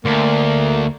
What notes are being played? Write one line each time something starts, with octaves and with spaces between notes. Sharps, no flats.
D2 A#3